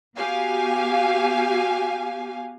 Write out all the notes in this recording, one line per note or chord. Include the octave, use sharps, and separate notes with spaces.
B3 F#4 G4 F5 G#5